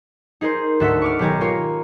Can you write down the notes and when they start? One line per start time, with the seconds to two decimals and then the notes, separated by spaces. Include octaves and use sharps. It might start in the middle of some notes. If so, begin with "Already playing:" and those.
0.41 D#4 G#4 A#4 C5
0.80 D2 G#2 F#4 A4 E5 B6
1.02 C#6 D6 F6
1.19 B1 D#3 G4 G#5 A#5
1.41 A#3 F4 A#4 C#5